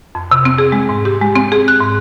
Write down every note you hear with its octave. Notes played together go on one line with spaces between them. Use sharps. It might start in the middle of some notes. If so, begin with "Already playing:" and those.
F2
C3
C4
G#4
G#3
G#2
G4
G#3
C4
G#4
F#6
G#2